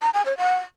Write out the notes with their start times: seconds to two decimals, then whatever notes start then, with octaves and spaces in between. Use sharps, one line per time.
0.02 A#5
0.14 G#5
0.26 C#5
0.38 F#5